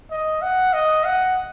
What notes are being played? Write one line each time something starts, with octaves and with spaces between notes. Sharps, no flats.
D#5
F#5
D#5
F#5